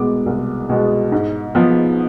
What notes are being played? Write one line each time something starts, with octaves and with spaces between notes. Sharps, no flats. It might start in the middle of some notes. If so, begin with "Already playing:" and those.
Already playing: C2 B2 G#3 B3 D6
C2
B2 G#3 B3
G#2
F3 B3